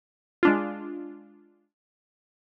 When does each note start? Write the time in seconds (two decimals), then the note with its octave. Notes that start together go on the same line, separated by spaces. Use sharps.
0.43 G#3 D4 F4